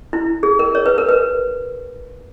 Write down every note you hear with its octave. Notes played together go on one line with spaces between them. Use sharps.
E4
G#4
A#4
C#5
B4
A#4
B4